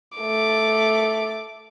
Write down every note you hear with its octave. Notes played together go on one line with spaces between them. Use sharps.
A3 D6